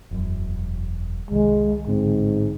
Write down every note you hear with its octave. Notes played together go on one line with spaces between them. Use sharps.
E1 F#2
C2 C3 D#3 G#3
A1 G#2 D3 C4